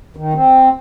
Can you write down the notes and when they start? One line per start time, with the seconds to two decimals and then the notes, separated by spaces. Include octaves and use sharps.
0.16 D#3
0.33 C4